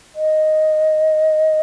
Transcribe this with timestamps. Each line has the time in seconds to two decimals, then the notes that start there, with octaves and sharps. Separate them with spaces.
0.15 D#5